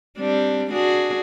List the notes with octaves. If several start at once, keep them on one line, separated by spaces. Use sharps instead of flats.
G3 C4 D4
D4 F#4 G#4